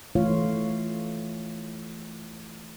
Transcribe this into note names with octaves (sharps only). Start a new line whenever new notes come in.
E3 A3 F4 C#5 F5